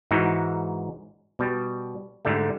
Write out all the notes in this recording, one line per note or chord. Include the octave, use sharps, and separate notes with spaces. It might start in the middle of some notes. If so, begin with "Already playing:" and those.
G#2 E3 D#4 E4 F#4
B2 G3
G#2 D3 G3 A3